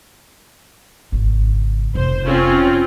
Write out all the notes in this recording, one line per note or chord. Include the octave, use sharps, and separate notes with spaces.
G#1 C#3
F1 C5
C4 C#4 F4